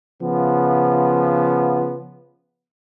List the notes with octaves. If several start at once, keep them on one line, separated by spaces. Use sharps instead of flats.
C#3 F3 B3